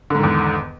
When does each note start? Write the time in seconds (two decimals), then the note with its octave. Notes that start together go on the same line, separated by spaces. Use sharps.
0.10 D3
0.15 G#2
0.19 D#3
0.23 E2